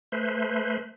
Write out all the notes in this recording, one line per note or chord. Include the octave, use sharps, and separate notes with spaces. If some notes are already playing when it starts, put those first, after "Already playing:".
A3 B4 C5